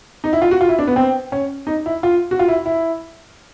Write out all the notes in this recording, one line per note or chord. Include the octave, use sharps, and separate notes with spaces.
D#4
E4
F4
F#4
F4
E4
D4
B3
C4
C#4
D#4
E4
F4
F#4
F4
E4
E4